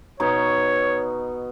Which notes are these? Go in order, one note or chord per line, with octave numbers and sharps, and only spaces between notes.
B2 D#4 C#5 C#6